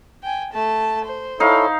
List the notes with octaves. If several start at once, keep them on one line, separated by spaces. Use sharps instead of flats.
G5 G#5
A3 A5
C5
D#4 E4 A4 C#5 F5